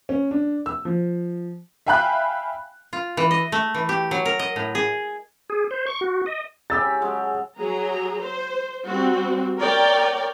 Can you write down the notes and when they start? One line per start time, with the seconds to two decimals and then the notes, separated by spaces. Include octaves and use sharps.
0.09 C#4
0.31 D4
0.66 E6
0.85 F3
1.87 E5 F5 G5 G#5 B5 F#6
2.93 F4
3.17 E3
3.31 D#5
3.52 A3
3.75 E3
3.89 G4
4.11 F#3
4.25 A#4
4.39 D#5
4.56 A2
4.75 G#4
5.50 G#4
5.71 C5
5.87 C#6
6.01 F#4
6.26 D#5
6.70 C#3 G4 E6 A6
7.02 F#3 G#3 A5
7.59 F#3 G#4 A#5
8.22 C5
8.86 G3 C4 F#4
9.58 A#4 C#5 D5 G5